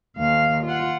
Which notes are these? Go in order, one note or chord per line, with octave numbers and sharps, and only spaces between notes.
D#2 F5
F4 F#5